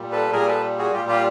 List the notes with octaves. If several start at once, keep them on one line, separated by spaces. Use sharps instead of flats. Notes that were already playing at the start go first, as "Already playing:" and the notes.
Already playing: A#2 G3
A4 B4
A#2 G3 G#4 A#4
A4 B4
F#4 G#4
A#2 G3 F4 G4
F4 G4